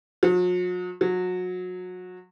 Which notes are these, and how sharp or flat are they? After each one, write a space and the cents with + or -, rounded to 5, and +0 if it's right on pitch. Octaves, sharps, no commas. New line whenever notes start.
F#3 -45
F#3 -25